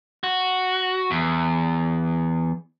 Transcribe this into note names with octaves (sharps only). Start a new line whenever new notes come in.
F#4
E2